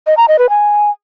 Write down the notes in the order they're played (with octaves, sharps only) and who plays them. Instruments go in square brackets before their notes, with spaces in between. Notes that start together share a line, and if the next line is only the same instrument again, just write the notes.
[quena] D#5
A#5
D#5
B4
G#5